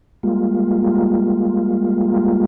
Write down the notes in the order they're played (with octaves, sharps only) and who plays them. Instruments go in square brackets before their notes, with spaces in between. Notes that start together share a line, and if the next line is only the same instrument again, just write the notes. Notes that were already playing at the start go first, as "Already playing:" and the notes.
[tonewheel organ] G3 G#3 A#3 F4